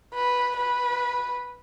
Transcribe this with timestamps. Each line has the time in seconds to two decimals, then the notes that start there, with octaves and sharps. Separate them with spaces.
0.15 B4
0.57 B4